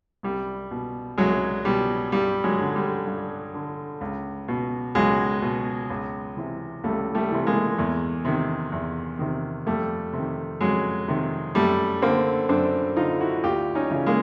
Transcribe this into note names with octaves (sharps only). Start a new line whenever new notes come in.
C2 G3
B2
C2 F#3 G#3
B2 G3
G2 G3
F#3 G#3
D3
G3
G2
D3
C#2
B2
C#2 F#3 G#3
B2
C#2
C3 E3
C#2 G3 A3
G3 A3
C3 E3
G#3 A#3
E2
C3 D#3
E2
C3 D#3
F2 G3 A3
C3 D#3
F2 F#3 G#3
C3 D#3
F#2 G3 A3
D3 A#3 C4
F#2 C4 D4
D3 D#4 F4
E4 F#4
D2 F4 G4
C#4 D#4
C#3 E3
G#3 A#3